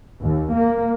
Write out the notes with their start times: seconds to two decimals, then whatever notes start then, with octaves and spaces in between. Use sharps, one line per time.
0.23 D#2
0.54 A#3